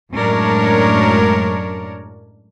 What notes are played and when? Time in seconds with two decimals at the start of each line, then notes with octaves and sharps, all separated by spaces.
0.14 F#2 A2 G#3 D4 A#4 C#5